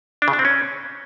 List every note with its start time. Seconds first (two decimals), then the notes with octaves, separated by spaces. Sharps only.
0.22 D4
0.28 C#3
0.33 D4
0.39 C4
0.45 C#4